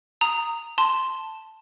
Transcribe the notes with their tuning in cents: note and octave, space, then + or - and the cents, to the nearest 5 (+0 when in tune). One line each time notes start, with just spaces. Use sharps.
A#5 -10 D#6 +0
A5 +0 C6 +0